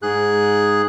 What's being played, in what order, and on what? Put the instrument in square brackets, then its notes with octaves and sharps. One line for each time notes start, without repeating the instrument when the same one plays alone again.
[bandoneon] G#2 G#4 F#6